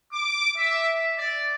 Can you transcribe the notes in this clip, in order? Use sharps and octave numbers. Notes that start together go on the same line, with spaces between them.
D6
E5
D5